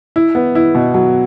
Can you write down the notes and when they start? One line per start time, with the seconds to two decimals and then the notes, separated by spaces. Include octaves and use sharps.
0.16 E4
0.35 B3
0.55 E4
0.75 B2
0.94 F#3